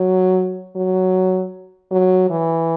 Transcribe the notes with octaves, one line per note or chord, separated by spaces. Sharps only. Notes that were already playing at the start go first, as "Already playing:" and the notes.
Already playing: F#3
F#3
F#3
E3